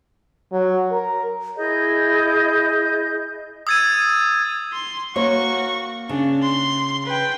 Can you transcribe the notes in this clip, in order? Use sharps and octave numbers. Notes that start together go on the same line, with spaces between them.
F#3
A#4
E4 G#4 D#5 G6
D#6 E6 G#6 A6 D#7
C6
A#3 F#4 C#5 C#6
C#3 D4
C6
B4 G5